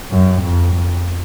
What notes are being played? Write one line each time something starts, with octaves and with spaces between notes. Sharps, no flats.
F#2
F2
F2